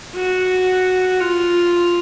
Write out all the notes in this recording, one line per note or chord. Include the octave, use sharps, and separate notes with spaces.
F#4
F4